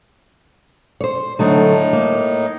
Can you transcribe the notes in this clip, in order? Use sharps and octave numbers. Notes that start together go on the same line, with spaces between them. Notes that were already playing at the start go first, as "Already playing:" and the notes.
C5 C#5
A2 D3 F#3 A3 D#4
A#3